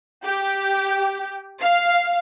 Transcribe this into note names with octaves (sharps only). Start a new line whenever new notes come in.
G4
F5